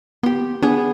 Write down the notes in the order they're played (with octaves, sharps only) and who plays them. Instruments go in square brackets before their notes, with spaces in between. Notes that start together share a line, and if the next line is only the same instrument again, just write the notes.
[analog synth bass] B3 [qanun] G4 C6
[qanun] B3 G#4 [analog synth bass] D4